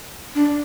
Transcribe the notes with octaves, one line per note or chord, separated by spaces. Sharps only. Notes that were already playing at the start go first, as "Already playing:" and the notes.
D4